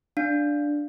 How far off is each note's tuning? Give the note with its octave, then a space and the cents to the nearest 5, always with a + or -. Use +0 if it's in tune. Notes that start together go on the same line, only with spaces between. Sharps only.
D4 +0 F5 +0